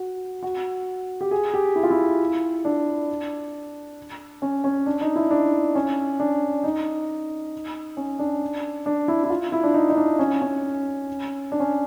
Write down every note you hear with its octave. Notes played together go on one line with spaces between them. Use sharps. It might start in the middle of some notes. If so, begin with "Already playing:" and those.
Already playing: F#4
F#4
G4
G#4
G4
E4
F4
E4
D4
C#4
C#4
D4
D#4
E4
D4
C#4
D4
D#4
C#4
D4
D4
E4
E4
F4
E4
D4
D#4
D#4
D4
C#4
C#4
D4
C#4